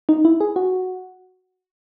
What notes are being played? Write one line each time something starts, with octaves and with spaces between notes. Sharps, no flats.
D#4
E4
G#4
F#4